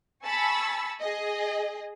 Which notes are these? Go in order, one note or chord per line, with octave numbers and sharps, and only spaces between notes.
G#5 A5 B5 C#6 E6 A6
G#4 D#5